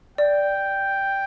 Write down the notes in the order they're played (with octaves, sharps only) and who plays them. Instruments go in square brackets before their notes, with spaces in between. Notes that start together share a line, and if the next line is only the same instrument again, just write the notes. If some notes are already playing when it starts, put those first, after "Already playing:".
[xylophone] D5 [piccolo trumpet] G5